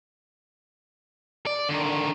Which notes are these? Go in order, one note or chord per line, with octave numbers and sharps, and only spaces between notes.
D5
D3 D#3